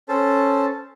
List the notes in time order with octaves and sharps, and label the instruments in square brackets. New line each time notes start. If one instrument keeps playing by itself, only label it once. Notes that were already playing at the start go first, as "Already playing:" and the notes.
[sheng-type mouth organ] C#4 A4 C5 A5